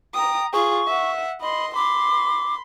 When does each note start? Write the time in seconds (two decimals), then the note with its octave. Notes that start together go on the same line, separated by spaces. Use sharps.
0.14 G5 A#5 D#6
0.53 F4 G#4 C#6
0.87 E5 F#5
1.41 D#5 B5 C6
1.75 B5 C6 D6